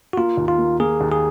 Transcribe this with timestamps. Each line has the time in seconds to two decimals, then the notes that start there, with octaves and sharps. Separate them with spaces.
0.13 F#4
0.17 A#3 F4
0.37 D#2
0.48 F4
0.59 A#3
0.80 A#3 G#4
1.01 D#2
1.12 G#4